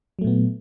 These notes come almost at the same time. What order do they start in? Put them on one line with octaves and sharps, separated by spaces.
F#3 A3 A#2 B3